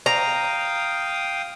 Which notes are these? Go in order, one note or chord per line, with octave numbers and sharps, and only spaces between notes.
F5 G5 A#5 D#6